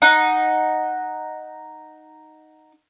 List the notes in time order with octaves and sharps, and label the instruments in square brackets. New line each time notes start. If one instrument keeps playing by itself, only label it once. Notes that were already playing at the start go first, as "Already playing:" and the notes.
[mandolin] D#4 F#5